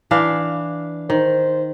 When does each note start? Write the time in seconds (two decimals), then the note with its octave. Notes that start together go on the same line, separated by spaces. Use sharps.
0.11 E3 D4 F5
1.10 D#3 C5